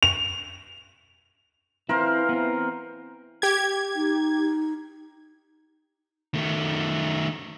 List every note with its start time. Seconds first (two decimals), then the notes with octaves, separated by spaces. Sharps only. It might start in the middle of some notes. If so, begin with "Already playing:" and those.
0.03 F7
1.89 E3 C4 E4 A#4 C5 F5
2.29 B3 C4
3.42 G4 G#6
3.96 D#4
6.34 D#3 A3